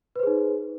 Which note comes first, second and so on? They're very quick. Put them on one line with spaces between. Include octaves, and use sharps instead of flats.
B4 C5 G#4 D#4